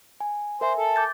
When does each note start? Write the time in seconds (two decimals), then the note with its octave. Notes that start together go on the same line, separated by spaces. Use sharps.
0.20 G#5
0.61 A#4 C5 E5 G#5
0.78 A4
0.96 D6 G6 A6